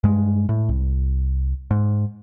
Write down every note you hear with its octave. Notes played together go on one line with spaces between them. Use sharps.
G2 G#3
A2
C2
G#2